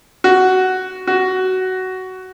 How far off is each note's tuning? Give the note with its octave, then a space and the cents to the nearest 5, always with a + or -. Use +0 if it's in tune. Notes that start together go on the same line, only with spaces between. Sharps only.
F#4 +10
F#4 +15